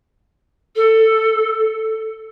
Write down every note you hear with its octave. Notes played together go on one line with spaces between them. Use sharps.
A4